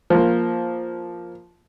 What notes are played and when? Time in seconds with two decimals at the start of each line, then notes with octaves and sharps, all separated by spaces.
0.10 F3 A#3